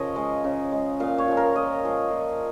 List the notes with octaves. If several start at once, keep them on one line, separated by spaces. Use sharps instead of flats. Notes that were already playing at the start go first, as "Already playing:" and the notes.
Already playing: C#3 F3 A#4 C#5 D#5
G#3
C#3
G#3
A#2 F5
C#5
F3 G#3
A#4
A#2 D#5
F3 G#3
A#2